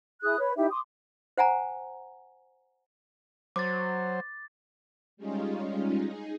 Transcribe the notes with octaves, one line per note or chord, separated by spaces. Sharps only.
E4 G#4 D#6 F#6
B4 C#5
D#4 E4 G4 E5
C6 D6 D#6
C5 F#5 G#5 A#5
F#3 C5 D6 A6
G3 G#3 C#4 D#4 F4
D#4 G#4